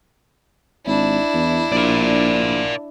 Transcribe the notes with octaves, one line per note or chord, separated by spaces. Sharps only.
G#1 D4 E4
E2
A#1 A#4 D5